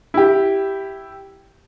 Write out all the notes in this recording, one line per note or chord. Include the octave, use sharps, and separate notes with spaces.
E4 G4